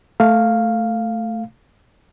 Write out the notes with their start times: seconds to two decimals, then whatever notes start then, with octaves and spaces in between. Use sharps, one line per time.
0.20 A3 F5